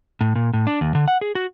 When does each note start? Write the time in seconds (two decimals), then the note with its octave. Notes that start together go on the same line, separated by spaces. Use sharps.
0.21 A2
0.36 A#2
0.53 A2
0.67 D4
0.81 D#2
0.95 D3
1.08 F#5
1.21 G#4
1.35 F#4